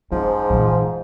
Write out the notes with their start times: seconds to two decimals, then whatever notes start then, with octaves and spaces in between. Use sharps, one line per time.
0.12 G#2 F3 C#4
0.50 A#2 E3